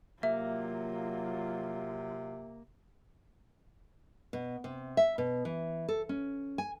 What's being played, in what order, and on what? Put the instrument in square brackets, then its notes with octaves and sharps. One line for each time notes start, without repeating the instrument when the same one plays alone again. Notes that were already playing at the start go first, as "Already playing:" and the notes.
[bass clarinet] C3 [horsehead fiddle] F#3 F4 [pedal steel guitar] A#3 [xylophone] E5
[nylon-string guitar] B2
C3
E5
B2
E3
A4
C#4
G#5